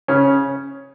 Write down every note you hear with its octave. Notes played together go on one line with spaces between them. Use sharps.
C#3 C#4